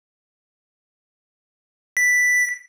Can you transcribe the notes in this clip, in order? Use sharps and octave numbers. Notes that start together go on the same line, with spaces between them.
B6